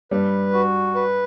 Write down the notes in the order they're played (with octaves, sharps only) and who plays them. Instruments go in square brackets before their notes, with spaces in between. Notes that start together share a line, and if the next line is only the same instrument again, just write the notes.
[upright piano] G2 G3 [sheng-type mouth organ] B4
[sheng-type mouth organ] F#4
B4